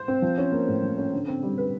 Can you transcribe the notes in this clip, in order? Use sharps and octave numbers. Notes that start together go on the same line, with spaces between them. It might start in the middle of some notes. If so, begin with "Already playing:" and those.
Already playing: C5
C4
F3
C#4
A#3
A2
F3
C#4
D3
C4
G3
B4